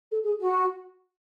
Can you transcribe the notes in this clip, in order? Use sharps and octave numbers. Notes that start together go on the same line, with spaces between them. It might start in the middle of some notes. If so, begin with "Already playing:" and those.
A4
G#4
F#4